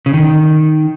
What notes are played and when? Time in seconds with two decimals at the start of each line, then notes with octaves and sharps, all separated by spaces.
0.06 C#3
0.14 D#3